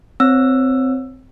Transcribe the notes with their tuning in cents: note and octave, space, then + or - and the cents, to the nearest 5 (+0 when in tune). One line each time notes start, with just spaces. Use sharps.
C4 -15 C#5 +0 E6 +15